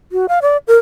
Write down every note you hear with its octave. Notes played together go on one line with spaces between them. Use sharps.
F#4
F5
D5
A#4